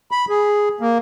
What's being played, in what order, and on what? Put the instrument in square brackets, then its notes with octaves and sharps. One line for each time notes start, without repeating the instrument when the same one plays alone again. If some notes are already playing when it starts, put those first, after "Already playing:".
[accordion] B5
G#4
A#3